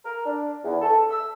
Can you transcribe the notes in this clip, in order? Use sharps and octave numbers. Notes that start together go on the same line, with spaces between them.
A#4
D4
E2
A4
E6